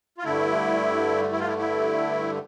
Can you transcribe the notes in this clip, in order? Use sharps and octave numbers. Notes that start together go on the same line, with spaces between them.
F4
G2 D3 A3 E4
E4
F4
E4
E4